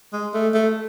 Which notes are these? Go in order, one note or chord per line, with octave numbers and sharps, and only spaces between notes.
G#3
A3
A3